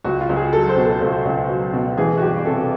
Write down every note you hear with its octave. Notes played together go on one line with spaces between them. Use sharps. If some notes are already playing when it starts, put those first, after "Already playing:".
C#2 F#4
F4
C#2
G#4
F#3 A4
C5
B2
A4
C#2 A4
C#2
F#3
B2
E3 G#4
F#4
G1 G4
C3 A4